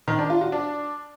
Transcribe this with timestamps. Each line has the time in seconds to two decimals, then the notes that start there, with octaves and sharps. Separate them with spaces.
0.08 D#3
0.19 D4
0.30 F4
0.41 F#4
0.52 D4